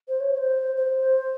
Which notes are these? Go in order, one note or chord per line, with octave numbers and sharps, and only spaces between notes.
C5
C#5
C#5
C5
C5